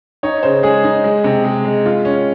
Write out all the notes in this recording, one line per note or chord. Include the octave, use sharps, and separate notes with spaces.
D#4 C#5
C#3 C5
G#3 G#4
D#4
G#3
C3
G#3
G#3
F4
C#4